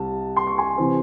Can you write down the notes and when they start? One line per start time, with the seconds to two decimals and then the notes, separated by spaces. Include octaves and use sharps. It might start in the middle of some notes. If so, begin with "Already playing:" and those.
Already playing: C2 C3 A5
0.37 C6
0.47 C#6
0.58 G#5 C6
0.78 C3 E3 C4